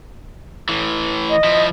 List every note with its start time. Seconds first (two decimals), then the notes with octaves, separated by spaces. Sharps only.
0.69 A2 E3
1.30 D#5
1.44 F3 E4